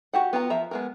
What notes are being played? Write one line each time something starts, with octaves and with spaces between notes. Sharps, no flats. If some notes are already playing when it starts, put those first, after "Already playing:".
F#4 G4 F#5
B3 F4 F#4 A#5
F3 E5 A#5
G#3 B3 A#4